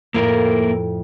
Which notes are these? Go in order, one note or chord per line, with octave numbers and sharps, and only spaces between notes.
F2 A2 A#3 E4 A#4